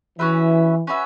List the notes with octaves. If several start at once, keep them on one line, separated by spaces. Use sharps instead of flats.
E3 C#4 F#4 B4 E5
C#4 F#4 B4 E5